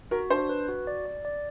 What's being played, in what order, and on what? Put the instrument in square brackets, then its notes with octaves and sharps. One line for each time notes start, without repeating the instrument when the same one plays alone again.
[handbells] F#4 [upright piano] A#4
[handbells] D4 [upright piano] C5
[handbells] B4
F#4
D5
D5
D5